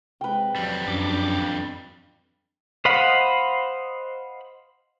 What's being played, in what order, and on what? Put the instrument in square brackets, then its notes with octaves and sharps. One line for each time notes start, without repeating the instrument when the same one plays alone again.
[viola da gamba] C3 G#3 [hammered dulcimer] B4 G5
[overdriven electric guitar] F2 G3 [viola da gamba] F#3
[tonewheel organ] F#2 D6 [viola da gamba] D4
[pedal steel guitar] C5 D#5 F5 F#5 B5